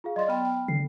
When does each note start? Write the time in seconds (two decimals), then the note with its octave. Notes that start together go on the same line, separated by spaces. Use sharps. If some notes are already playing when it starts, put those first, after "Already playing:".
0.04 F4 G#4 F5
0.16 F#3 D5 D#5 C6 A6
0.28 B3 G5 B5 F6
0.45 G5
0.68 D3 C7